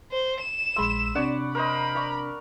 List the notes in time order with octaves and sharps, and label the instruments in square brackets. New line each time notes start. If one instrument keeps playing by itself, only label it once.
[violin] C5
E7
[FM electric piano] A#1 G#3 E6 [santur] B5 C6
[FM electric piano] C3 D4 [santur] C#5 D5 F#5
[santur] A#4 C5 D#5 [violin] B5
[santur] D5 A#5 C#6